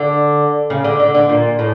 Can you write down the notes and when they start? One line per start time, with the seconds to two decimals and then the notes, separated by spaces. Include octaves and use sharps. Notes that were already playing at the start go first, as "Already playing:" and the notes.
Already playing: D3
0.70 C#3
0.84 D3
1.00 D3
1.14 D3
1.29 A#2
1.59 A2